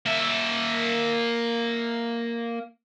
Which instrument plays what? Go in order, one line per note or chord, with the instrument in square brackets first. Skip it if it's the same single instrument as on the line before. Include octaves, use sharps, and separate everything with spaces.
[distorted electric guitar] A#3 E5